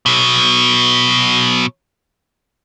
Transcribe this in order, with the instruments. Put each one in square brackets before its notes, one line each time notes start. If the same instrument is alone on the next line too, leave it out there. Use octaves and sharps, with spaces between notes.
[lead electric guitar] B2 F#3